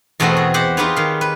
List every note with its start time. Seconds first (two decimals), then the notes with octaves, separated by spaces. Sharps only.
0.20 E2 B2 A3 C4 F#4 D#5
0.37 G#4
0.54 G4 C5 F#5
0.77 D#4 F4 G4 G#4 B4 C#5
0.96 D#3 F5
1.21 B4